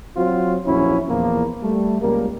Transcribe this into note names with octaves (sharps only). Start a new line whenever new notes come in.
F#3 C4 F4 F#4
A#1 E2 F#3 C#4 E4
E2 A#2 F3 A#3
G3 A3
C#2 G3 A#3